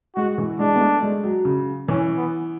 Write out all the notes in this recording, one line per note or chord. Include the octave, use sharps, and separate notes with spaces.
G#3 F#4
E3
G#3 D4
B3
A3
G#3
F#3
C#3
E3 C#4
B3